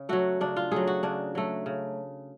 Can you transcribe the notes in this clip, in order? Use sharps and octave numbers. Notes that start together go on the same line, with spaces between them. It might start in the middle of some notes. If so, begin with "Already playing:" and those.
Already playing: C#3
F#3 A3 F#4
C#3 D4
F4
F#3 A3 G#4
F#4
C#3 D4
F#3 A3
C#3